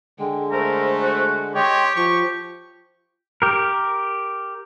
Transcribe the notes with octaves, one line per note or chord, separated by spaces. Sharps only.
D3 G#3 G5
A3 A#4 C5
F#4
G4 C#5 D#5 G5 C6
F3 F4 C#6
G4 A#4